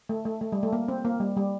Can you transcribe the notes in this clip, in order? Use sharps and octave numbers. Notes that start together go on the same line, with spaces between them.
A3
A3
A3
G3
A3
A#3
C4
A#3
G3
G3